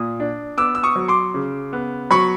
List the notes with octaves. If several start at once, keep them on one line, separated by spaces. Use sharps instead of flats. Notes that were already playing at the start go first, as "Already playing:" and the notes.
Already playing: A#2 D#6
D4
B3 D6 E6
E6
C#6 D#6
F#3
C6 D6
C#3
B3
F#3 B5 C#6